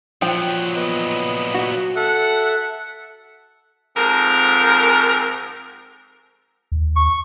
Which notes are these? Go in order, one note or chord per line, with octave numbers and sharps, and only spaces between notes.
A#2 F3 F#3 G5 F#6
B3 D#5
F#4
A4 E5 F#5
F2 G#2 A#4
D#2
C#6